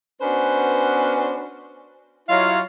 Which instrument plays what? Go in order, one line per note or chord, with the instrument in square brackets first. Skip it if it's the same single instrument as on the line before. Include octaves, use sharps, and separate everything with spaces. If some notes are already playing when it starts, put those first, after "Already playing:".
[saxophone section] B3 C#4 D4 F#4 B4 C5
F#3 E4 F4 C#5 D#5 F5